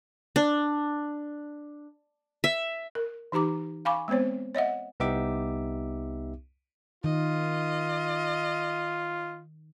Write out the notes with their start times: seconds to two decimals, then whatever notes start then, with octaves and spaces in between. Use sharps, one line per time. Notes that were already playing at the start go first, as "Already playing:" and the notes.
0.36 D4
2.44 E5
2.95 A#4
3.32 E3 D#4 G4 A#5 D6
3.85 F5 G#5 B5 C#6 D6
4.08 G#3 B3 C4 C5 C#5
4.55 C#5 D#5 E5 F#5
5.00 C2 B3 D#4 G4 E5 D6
7.04 D#3 F4 D#5